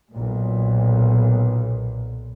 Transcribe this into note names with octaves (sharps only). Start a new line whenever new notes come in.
B1 A#2